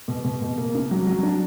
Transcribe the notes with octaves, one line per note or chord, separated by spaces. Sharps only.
B2
B2
B2
A#3
C#3
F#3
F#3
D4